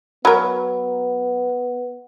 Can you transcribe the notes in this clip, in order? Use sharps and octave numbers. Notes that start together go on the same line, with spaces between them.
F#3 B3 A#4 B5